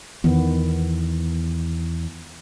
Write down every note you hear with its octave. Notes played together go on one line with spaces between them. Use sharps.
E2 D#3 B3